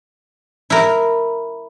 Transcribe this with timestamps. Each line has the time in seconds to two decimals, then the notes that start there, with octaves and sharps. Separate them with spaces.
0.70 E4 A#4